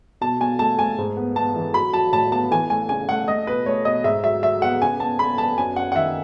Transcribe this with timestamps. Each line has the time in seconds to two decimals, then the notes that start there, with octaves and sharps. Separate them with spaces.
0.21 B2 A5
0.40 B2 G#5
0.59 A3 A5
0.78 A3 G#5
0.98 G#2
1.17 B3
1.36 B3 A5
1.56 E3
1.74 F#3 B5
1.93 F#3 A5
2.12 A2 A5
2.32 B3 A5
2.51 E3 G#5
2.70 A3 G#5
2.89 C#3 G#5
3.09 A3 F#5
3.28 A3 D#5
3.47 B2 B4
3.66 A3 C#5
3.85 B2 D#5
4.04 G#2 E5
4.24 F#3 E5
4.43 F#3 E5
4.62 B3 F#5
4.81 C#3 G#5
5.00 B3 A5
5.19 B3 B5
5.38 B3 A5
5.58 F#2 G#5
5.76 F#2 F#5
5.92 F#5
5.96 D#3 E5